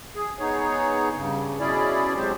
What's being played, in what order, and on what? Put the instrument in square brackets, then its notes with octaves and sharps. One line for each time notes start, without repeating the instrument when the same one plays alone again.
[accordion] G#4
B3 D#4 G#4 C#5
G2 C#3
B2 C#4 E4 G#4 D5
B2 F#3 G#3 C4 G4 C5